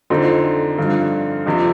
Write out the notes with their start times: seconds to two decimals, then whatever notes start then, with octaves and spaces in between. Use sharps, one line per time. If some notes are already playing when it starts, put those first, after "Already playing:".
0.10 F2 D3 F3 C4 D#4
0.78 G2 D3 F3
1.46 F2 C3 F3